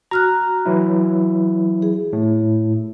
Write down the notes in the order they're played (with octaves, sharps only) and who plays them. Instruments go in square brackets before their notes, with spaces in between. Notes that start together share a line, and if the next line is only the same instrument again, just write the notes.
[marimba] F#4 F6 F#6 [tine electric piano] A#5
[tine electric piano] E3 F#3 E4
[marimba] G#4
[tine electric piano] A2